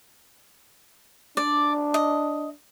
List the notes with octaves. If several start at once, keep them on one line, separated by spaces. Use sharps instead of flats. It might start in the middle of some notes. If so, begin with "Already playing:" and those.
D4 D5
D#5